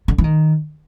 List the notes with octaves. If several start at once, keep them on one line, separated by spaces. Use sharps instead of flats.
D3
E3
D#3